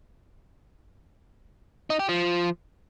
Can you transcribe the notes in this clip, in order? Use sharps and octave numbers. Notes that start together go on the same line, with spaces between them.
D#4
G4
F3